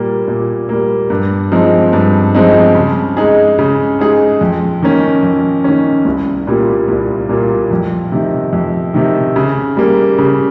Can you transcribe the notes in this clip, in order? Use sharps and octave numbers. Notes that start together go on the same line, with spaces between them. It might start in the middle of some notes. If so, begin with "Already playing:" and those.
Already playing: A#2 G3 A#3
A#2
G3 A#3
G2
F3 G#3 C4 D#4
G2
F3 G#3 C4 D#4
C#3
G#3 D#4 G#4
C#3
G#3 D#4 G#4
F2
D#3 A#3 C#4
F2
D#3 A#3 C#4
C2
A#2 G3 A#3 F4
C2
A#2 G3 A#3 F4
F2
C3 D#3
F2
C3 D#3
C#3
G3 A#3
C#3